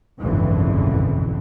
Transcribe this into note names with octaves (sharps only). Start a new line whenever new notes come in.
F#1 B1 F2 G#2 D3 E3